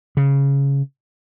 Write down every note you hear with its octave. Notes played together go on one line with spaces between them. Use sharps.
C#3